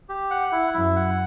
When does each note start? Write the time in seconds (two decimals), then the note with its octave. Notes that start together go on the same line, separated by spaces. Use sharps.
0.09 G4
0.31 F#5
0.52 E4
0.74 F#2 E4
0.96 F#5